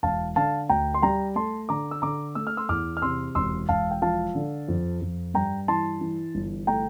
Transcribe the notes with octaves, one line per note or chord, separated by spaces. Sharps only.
E1 F5 A5
D3 F5 A5
D2 G5 A#5
C6
G3 G5 A#5
A3 A5 C6
D3 A#5 D6
E6
D3 A#5 D6
A3 E6
F6
C6 E6
E2 D6 F6
F6
C3 C6 E6
E1 C6 E6
E1 F5 A5
G5
F3 F5 A5
D3
F2
F2
G2 G5 A#5
E3 A5 C6
E3
G1
A3 G5 A#5